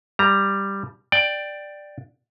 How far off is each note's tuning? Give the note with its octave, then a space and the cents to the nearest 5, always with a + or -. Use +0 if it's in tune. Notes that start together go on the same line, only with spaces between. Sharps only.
G3 +5 A#5 +0
D5 +10 G5 +0